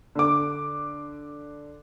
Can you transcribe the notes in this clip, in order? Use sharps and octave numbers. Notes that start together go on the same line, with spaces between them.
D3 D6